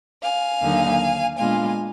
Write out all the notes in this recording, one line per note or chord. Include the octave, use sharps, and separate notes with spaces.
F5 G#5
D#2 D3 F#3 A#3 D#4
A#2 G#3 B3 D4 F4 F5 G#5